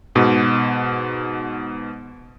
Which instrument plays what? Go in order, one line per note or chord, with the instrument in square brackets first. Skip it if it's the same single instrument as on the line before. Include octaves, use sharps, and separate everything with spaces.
[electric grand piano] G#2 B2